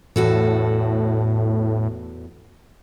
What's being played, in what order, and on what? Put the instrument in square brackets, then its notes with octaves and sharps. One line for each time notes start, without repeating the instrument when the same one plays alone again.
[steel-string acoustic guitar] E2 F#4 A4 [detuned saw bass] A2